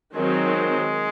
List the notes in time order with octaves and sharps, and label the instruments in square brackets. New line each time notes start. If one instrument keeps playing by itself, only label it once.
[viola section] D#3 F#3 C4 [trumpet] G#3